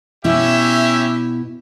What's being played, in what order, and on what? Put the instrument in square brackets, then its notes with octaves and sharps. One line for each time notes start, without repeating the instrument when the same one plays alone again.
[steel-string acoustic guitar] B2 E4 [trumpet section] C#4 G4 E5